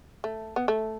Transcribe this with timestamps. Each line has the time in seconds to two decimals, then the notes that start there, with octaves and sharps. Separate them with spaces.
0.24 A3
0.56 B3
0.68 A3